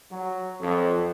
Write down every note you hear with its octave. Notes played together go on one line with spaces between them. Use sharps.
F#3
F2